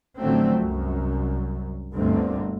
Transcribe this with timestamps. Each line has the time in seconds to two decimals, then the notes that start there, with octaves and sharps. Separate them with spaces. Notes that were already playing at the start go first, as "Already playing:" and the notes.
0.19 A1 D3 F3 F#3 A3 C4
0.59 C2 F#2
1.95 G1 D2 G2 D3 A#3 C4